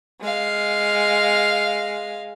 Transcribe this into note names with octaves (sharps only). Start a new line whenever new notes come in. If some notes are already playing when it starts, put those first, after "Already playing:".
G#3 F5